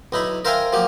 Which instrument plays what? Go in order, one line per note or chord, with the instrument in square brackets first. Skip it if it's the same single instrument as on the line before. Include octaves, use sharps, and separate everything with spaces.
[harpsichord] B1 D#4 E4 B5
A#4 C5 E5 F5 G5 G#5
F3 F#3 A#3 G4